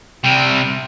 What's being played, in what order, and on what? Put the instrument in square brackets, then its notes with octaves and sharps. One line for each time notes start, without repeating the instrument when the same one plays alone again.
[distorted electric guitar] C3 G3